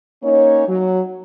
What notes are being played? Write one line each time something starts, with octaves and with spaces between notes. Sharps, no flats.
A#3 C#4 D#4 C#5
F#3